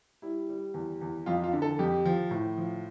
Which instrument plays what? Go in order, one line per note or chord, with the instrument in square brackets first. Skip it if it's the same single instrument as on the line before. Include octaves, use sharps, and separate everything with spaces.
[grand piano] G3 E4
G3
E2
E2
F2 F4
F4
D3
A4
F2 G4
F3
A2
F3